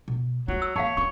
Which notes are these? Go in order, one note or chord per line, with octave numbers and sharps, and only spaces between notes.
B2
F#3 A3 F4
E6
E3 A#3 C#5 F5 F#5 A5
C#4 F4 C#6